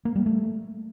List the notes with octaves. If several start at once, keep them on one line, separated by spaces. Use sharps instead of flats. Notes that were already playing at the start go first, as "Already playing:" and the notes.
A#3
G3
A3